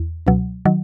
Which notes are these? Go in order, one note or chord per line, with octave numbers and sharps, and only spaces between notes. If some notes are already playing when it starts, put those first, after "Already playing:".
Already playing: E2
C#2 B2 F#3
D#3 F#3